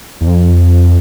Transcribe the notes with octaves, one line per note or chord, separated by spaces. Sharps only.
E2
F2